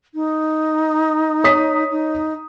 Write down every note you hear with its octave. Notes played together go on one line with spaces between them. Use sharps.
D#4
C#5 D#6 B6
D#4